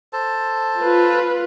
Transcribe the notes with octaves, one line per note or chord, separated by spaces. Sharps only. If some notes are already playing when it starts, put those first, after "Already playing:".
A4 C5 A5
F4 B4